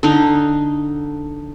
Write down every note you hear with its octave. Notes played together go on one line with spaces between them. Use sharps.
D3 D#4